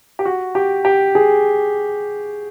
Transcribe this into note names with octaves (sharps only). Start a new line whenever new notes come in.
G4
F#4
G4
G4
G#4